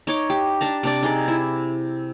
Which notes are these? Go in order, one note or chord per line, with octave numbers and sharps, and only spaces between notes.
D#4 C#5 D6
G4
D4 A5 A#5
C3 D4 D5
D#4 G#4 D5
E4